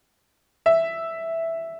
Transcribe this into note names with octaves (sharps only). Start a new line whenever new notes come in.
E5